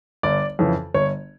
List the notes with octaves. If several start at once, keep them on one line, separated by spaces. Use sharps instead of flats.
G1 D5
F2 C#3 E3
G1 C#5